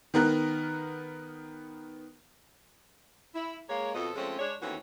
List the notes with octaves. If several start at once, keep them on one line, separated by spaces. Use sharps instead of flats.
D#3 B3 A#4 F#6
E4
G#3 A#3 C#5
F2 B2 F3 A4 D#5
F3 G#3 A3 C4 C#4
G#3 D4 C#5
D#2 E3 A3 C4 C#4 F#4